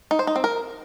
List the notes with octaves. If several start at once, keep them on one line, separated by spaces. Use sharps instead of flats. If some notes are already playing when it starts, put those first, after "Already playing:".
D#4
C5
D#4
C4
A#4